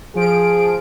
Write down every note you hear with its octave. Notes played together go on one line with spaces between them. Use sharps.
F3 G#4 D7